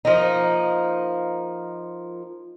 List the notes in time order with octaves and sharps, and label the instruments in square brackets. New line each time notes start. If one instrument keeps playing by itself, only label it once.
[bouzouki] F3 A#3 D#4